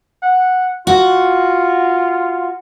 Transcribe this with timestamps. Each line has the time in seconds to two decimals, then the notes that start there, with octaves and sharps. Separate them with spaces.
0.23 F#5
0.87 F4 F#4